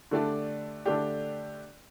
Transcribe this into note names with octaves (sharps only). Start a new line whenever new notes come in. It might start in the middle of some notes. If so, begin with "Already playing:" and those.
D3 A3 D4 G4 D5
D3 A3 D4 G4 D5